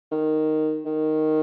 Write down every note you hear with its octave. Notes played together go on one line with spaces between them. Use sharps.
D#3
D#3